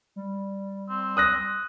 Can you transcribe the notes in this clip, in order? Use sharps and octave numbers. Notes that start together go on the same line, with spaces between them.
G3
C4
D#6 F#6 A#6